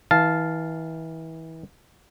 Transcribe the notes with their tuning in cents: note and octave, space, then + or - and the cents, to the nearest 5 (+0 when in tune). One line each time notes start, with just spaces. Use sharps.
E3 -30 F5 +0 A5 -10